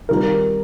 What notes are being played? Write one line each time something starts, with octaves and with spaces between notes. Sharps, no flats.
C3 D#3 G3 A#4